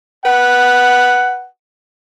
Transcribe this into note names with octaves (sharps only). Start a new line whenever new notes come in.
B4 F#5